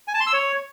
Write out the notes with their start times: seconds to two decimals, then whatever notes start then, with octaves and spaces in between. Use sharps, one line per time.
0.08 G#5
0.14 A5
0.20 C6
0.27 E6
0.33 C#5